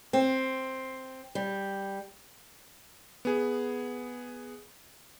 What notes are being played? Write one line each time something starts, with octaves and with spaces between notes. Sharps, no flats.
C4
G3
B3 G#4